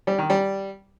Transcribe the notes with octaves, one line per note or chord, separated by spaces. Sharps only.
G3
D#3
G3